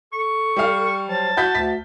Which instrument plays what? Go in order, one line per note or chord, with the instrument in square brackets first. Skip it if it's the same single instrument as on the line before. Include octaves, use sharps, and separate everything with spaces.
[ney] A4 [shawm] C#6
[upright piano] G3 F5
[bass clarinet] F#3 [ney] C5 [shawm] A5
[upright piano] F#4 G6 B6 [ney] F#5
[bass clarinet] D2 [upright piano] B6